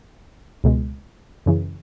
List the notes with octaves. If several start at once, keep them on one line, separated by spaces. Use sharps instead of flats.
C#2 B2 G#3
F#2 C#3 E3